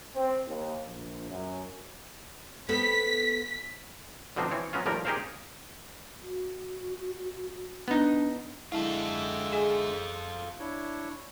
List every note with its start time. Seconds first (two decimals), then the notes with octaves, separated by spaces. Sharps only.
0.15 C4
0.47 D#2
0.85 A#1
1.29 F#2
2.69 B3 C4 A4 B6
4.36 B2 D3 F3 C4 D4 D#4
4.51 E3 C4 C#5
4.73 F#3 B3 C#4 F4
4.86 D#2 A2 F3 G3 A#3 A#4
5.05 D#4 G4 G#4 A#4 C5 F5
6.22 F#4
7.88 B3 D4 D#4
8.72 D3 G#3 E4 F4 A4 E5
9.52 G#4 D#5 G#5
10.59 D4 E4 C#5